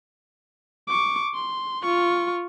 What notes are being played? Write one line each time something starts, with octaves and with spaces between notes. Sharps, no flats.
C#6 D6
C6
F4 C#6